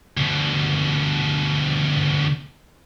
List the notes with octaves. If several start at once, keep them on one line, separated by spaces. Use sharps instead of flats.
D2 B2